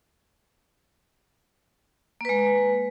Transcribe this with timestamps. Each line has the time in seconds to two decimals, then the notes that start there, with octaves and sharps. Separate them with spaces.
2.21 A#3
2.25 B4
2.29 G#3